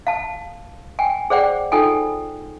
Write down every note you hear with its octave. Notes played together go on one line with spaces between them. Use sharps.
F5 A5
G5 G#5
G#4 C5 D5 F#5 G5
D#4 F4 A4 G5 G#5